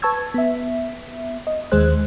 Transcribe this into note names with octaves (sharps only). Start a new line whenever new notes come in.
B4 A5 C#6 E6 G#6
B3 E5
D#5
D#2 D#3 G#3 G#4 C5 F#6